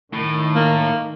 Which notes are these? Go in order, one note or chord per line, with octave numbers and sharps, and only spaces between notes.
A2 D#3
A#3